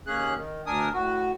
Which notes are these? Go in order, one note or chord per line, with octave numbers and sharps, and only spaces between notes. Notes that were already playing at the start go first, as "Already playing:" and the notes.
D#2 A#3 C#4 G#4 F#6
D#3
D2 D4 A#4 G#5 D#6
A2 F#4